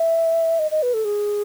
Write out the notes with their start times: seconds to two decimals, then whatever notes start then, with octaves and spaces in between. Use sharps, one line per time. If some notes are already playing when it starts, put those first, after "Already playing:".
Already playing: E5
0.59 D#5
0.71 D#5
0.82 B4
0.94 A4
1.05 G#4